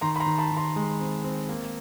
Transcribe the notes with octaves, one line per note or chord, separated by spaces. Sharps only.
D#3 A#5 C6
B5
A#5 C6
D#3
A5 B5
D#3
A#5 C6
G#3
C4
C4
A#3